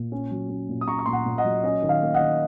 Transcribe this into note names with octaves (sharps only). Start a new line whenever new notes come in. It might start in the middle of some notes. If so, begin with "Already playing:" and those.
Already playing: A#2
C#4
F#3
C#4
A#2
D#6
C#4 A#5 C#6
C#6
A#2 C6
F#5 A#5
A#2
D#5 F#5
F#3
C#4 D#5
D#3
F5
A#3
D#5 F#5
D#3